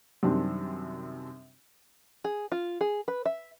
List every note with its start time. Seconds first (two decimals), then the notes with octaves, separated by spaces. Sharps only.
0.23 F#2 C3 D#3 G3 C4 D4
2.24 G#4
2.52 F4
2.81 G#4
3.08 B4
3.25 E5